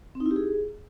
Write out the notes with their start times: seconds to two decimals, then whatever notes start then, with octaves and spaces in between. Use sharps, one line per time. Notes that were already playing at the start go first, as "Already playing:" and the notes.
0.15 C4
0.20 D#4
0.26 E4
0.31 G4
0.36 G#4